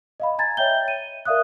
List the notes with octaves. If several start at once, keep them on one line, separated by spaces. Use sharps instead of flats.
D#5 F5 B5
G#5 A#5 G#6 A6
C#5 D#5 E5 G5 G6 G7
D#7
A#4 D5 E5 F5 D#6 F#6